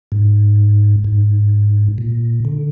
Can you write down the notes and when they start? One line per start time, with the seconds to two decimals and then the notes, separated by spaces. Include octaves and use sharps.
0.12 G#2
1.05 G#2
1.98 A#2
2.45 D3